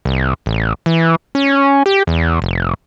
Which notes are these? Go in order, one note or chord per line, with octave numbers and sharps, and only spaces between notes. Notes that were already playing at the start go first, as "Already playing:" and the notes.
C2
A1
E3
C#4
G4
E2
F1